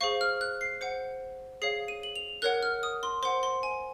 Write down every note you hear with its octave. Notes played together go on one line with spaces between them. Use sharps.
G#4 C5 F5 C#6
F6
F#6
C7
C5 F#5 C#7
G#4 C#5 F5 C7
D#7
F#7
F7
A#4 C#5 F#5 F#6
F6
D#6
C6
C5 F#5 C6
C6
G#5